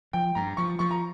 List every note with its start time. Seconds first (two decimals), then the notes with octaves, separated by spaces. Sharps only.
0.13 F3 G5
0.35 G2 A#5
0.57 F3 C#6
0.79 F3 C#6
0.91 A#5